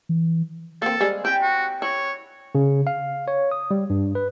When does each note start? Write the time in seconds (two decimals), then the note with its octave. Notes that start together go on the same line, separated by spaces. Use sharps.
0.09 E3
0.82 A#3 C4 A4
1.01 G3 G#3 G#4 C5
1.25 C4 E4 G4 G5 G#5
1.42 F#4
1.82 E4 C#5
2.55 C#3
2.87 F5
3.28 C#5
3.51 D#6
3.71 G3
3.90 G2
4.15 B4